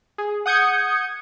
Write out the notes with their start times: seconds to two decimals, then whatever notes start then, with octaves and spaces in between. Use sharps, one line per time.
0.18 G#4
0.46 F#5 D#6 G6 G#6 C#7